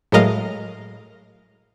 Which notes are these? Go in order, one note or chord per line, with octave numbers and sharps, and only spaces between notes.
A2 F#3 G#3 A#4 D#5 F5